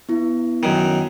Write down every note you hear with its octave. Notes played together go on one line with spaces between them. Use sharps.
B3 E4
F#2 D#3